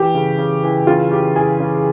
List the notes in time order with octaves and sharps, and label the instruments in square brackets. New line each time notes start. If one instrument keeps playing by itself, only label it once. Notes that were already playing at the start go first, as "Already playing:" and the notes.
Already playing: [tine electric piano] E3 [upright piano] G4
[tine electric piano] C#3
C#3
E3
[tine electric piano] C#3 [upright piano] F4
[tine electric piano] C#3 [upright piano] G4
[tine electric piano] E3 [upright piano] G#4
[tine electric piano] C#3